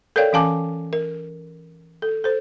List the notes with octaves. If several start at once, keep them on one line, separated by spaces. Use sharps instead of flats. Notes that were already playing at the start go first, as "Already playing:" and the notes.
A4 A#4 C#5 D5 F5 G5
E3 C#4 F5 G#5 A5 D6
A#4
A4
A4 C5